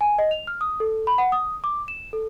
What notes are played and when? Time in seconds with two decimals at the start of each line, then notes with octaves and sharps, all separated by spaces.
0.01 G#5
0.18 D#5
0.31 F7
0.47 F6
0.61 D#6
0.80 A4
1.07 B5
1.18 F#5
1.32 D#6
1.64 D6
1.88 E7
2.13 A4